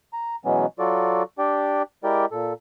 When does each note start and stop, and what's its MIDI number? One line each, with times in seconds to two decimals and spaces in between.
0.13 0.36 82
0.45 0.66 47
0.45 0.66 52
0.45 0.66 54
0.45 0.66 56
0.45 0.66 59
0.45 0.66 61
0.79 1.23 54
0.79 1.23 65
0.79 1.23 66
0.79 1.23 69
0.79 1.23 74
1.39 1.82 62
1.39 1.82 67
1.39 1.82 74
1.39 1.82 79
2.04 2.25 56
2.04 2.25 64
2.04 2.25 67
2.04 2.25 70
2.04 2.25 74
2.04 2.25 79
2.32 2.53 46
2.32 2.53 69